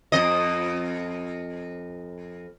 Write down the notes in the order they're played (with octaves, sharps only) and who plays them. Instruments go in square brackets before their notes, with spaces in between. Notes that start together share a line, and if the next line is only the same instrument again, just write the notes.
[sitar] F2 D#5